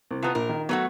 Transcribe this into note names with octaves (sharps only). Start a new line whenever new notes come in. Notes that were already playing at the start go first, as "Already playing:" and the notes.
C2
C3 B3 F4 A5 A#5
A#1 A#4
D#3
F#3 A3 B3 F#4